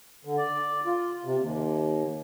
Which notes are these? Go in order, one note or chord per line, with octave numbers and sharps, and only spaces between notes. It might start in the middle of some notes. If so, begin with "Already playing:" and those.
D3
D5
F4
C3
D#2